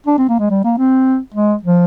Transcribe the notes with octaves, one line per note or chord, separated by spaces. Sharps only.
D4
C4
A#3
G#3
G3
A#3
C4
G#3
F3